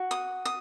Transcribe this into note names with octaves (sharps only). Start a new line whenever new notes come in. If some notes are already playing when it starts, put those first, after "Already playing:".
Already playing: F#4
D#6
D#6